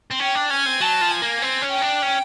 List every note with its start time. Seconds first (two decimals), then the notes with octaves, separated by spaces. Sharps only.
0.11 C4
0.20 C#4 G5
0.35 D4
0.50 C#4 G#5
0.66 C4
0.80 F#3 A5
1.01 F3
1.11 G#5
1.22 A#3
1.42 C4 G#5
1.62 C#4
1.72 G5
1.82 D4
2.03 C#4